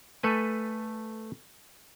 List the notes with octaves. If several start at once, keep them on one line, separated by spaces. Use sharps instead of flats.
A3 A4 B4 G#5